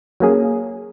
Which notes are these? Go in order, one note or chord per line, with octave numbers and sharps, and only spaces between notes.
F#3 A#3 C#4 G#4